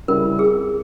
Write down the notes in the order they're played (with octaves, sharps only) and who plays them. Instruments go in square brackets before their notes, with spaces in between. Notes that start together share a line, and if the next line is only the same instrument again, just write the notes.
[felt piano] C#3 G3 C4 E4 [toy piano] A#4
[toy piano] G#4